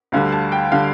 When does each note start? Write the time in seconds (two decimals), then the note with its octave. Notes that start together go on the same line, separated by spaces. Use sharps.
0.12 D2 D3 G3 F5
0.32 A5
0.52 G5
0.72 D3 G3 F5